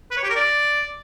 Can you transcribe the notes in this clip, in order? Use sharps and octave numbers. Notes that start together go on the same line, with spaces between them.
B4
C#5
G4
A#4
D5